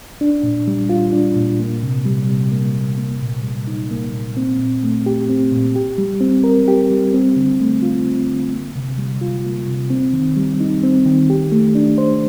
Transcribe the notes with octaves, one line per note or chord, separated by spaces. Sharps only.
D4
A#2
G3
F4
D4
A#2
A#3
C3
G3
C3
A#3
C3
A#3
A#2
G3
D#4
A#3
A#2
C4
A#2
A3
G4
C4
A#2
G4
G3
C4
A#4
G4
G3
C4
D3
A3
F4
C4
D3
A#3
C3
G3
F4
A#3
C3
C4
D#3
G3
D#4
C4
D#3
G4
A3
D4
C5